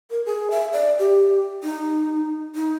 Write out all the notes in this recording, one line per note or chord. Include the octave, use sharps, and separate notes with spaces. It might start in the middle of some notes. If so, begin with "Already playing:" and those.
A#4
G#4
E5
D5
G4
D#4
D#4